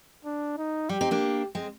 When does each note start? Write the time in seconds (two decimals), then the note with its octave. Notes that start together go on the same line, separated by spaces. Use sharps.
0.25 D4
0.57 D#4
0.89 G3 G4
1.01 C4 D#4
1.11 A#3 D4
1.55 G#3 C4